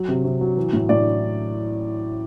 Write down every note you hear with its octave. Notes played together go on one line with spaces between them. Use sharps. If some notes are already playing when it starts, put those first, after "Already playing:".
Already playing: F#3
C3
C3
F#3
E3
A2
A2 D5